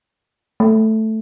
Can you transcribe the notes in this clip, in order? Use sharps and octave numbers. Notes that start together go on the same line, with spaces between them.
A3